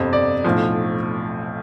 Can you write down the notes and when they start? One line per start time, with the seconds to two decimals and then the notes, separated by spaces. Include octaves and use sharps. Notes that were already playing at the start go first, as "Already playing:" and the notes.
Already playing: G1 F2 C3
0.13 D5
0.45 B1 A2 F3